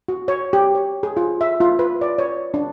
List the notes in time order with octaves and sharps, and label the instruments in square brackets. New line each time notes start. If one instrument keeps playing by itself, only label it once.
[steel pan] F#4
C#5
G4
C#5
G#4
F4
E5
F4
B4
D5
C#5
D4